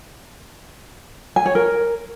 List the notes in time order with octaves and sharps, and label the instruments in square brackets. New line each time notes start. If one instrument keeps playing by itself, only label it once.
[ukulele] G#5
C#5
A#4